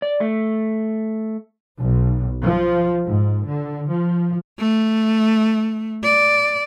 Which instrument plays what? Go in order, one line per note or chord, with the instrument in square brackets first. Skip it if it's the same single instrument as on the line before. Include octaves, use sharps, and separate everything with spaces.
[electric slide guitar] D5
A3
[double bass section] B1
F3
G#2
D3
F3
[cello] A3
D5